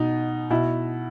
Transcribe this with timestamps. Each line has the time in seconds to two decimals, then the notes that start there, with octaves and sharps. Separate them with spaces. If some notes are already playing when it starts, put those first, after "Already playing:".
Already playing: B2 D#4
0.50 B2 E4